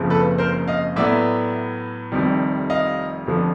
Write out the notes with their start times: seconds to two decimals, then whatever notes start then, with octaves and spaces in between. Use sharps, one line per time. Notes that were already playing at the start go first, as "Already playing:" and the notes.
Already playing: F#1 F2 C#3 F3
0.10 A4 B4
0.38 A#4 C5
0.68 D#5 F5
0.96 A2 F#3 B3 D5 E5
2.12 F1 F2 C3 D#3 G3
2.70 D#5 F5
3.27 F1 F2 D3 F3